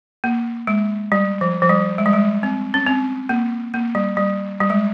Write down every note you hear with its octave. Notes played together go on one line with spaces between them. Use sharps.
A#3
G#3
G3
F3
F3
G3
G#3
G3
G#3
C4
C#4
C4
A#3
A#3
G3
G3
G3
G#3